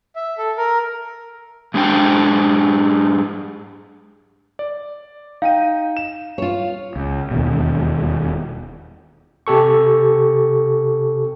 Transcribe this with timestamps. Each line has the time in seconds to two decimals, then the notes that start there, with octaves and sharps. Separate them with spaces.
0.16 E5
0.38 A4
0.58 A#4
1.74 G#2 G#3 D4 C5 G5
4.59 D5
5.42 D#4 F5 G5 D#7
5.97 E7
6.38 F4 C#5
6.96 C#2
7.31 E1 D#2 B2
9.47 C3 G4 A4 C#6